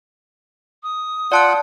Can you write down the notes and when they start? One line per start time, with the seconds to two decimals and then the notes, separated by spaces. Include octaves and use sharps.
0.83 D#6
1.32 F4 D5 F#5 A5 F#6